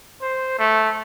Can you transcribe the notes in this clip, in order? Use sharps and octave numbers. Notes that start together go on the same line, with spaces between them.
C5
A3